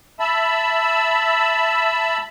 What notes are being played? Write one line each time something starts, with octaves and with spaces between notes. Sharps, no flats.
E5 A5 B5 E6